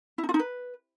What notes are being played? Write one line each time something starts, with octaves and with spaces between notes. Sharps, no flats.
E4
D#4
F4
D#4
B4